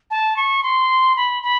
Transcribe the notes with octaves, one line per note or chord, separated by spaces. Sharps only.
A5
C#6
C6
B5
B5